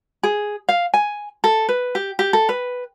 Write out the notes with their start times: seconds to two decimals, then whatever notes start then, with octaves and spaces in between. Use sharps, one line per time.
0.23 G#4
0.69 F5
0.94 G#5
1.44 A4
1.69 B4
1.95 G4
2.19 G4
2.33 A4
2.49 B4